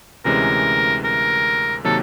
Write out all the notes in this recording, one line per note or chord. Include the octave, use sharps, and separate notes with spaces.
D2 C3 E3 G#3 C#4 A#4
A#4
C3 D#3 F#3 A#3 A4